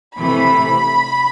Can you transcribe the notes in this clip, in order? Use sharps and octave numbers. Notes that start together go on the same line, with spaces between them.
C3 E3 A3 B5